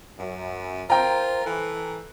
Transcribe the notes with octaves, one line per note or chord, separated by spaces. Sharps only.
F#2
F4 A#4 C5 G5 A#5
E3 A4